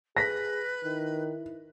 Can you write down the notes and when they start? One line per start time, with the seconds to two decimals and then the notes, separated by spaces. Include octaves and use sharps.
0.17 G#4 B4 A#6 B6
0.84 D#3 E4